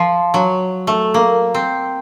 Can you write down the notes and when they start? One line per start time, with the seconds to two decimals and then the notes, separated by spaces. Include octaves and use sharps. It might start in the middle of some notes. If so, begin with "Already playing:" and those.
Already playing: F3
0.34 F#3
0.87 A3
1.14 A#3
1.54 C4